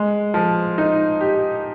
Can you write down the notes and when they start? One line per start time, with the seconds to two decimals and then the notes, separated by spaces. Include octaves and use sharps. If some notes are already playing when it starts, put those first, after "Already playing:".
Already playing: G#3
0.34 F3
0.78 D#4
1.21 G4